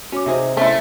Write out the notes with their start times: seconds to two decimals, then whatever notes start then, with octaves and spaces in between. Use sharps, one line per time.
0.12 C#4 F#4 D6
0.26 C3 D#4 G#4 C5 E5
0.57 A3 C#4 E4